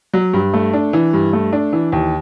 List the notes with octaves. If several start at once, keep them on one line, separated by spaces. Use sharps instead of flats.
F#3
G2
A3
D4
E3
G2
A3
D4
E3
D#2